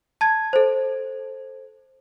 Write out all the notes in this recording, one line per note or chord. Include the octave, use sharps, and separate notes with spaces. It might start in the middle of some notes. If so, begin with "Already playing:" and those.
A5 G#6
A4 C5